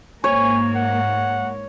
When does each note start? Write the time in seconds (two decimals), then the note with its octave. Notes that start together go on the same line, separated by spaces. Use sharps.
0.24 G#2 A#3 C#5 G#5
0.75 F#5